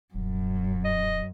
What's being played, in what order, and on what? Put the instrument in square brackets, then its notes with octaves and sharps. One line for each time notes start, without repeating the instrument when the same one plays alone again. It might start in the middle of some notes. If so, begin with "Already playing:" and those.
[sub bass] D#1 [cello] F#2
[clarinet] D#5